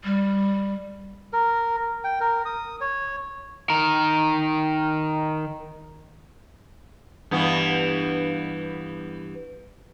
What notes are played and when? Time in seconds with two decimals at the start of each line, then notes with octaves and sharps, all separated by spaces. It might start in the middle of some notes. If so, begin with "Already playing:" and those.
0.04 G3
1.33 A#4
2.04 G5
2.20 A#4
2.45 D#6
2.81 C#5
3.70 D#3 A#4
7.31 G2 E3 B3